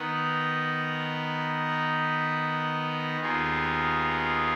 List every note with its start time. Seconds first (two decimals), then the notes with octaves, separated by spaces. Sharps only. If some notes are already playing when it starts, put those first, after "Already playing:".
Already playing: D#3 B3 D#4 B4
3.20 D#2 D#3 B3 F4 G#4